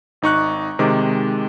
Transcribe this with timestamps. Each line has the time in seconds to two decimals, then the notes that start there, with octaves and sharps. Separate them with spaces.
0.22 G#1 D#4 C#6 F#6
0.79 C3 D#3 G#3 D6